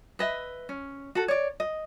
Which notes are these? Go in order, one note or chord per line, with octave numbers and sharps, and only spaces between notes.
B4 D#5 E5
C#4
F#4 A4
C#5 D5
D#5